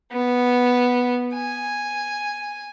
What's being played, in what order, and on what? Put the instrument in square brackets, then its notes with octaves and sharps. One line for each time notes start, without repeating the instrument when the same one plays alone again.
[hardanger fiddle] B3
G#5